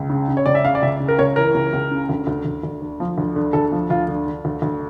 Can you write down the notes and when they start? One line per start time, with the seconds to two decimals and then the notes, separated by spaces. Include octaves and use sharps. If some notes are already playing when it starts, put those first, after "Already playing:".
Already playing: C#2
0.10 C#3
0.28 C#3
0.37 C#5
0.46 C#2 D5
0.55 E5
0.64 C#3 F5
0.75 D5
0.83 C#2 E5
1.00 C#3
1.08 A#4
1.18 C#2 C#5
1.36 E3 A#4
1.54 C#2
1.73 C#2
1.91 C#3
2.09 D2
2.27 D2
2.45 D2
2.63 D2
2.82 D3
3.00 F3
3.18 D2
3.36 D3
3.53 D2 A4
3.72 F3
3.90 D2 F4
4.08 D3
4.27 D3
4.45 D2
4.62 D2